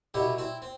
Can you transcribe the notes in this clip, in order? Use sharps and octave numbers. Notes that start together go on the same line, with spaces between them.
C2 B2 F#3 E4 G4
C4 E4
C4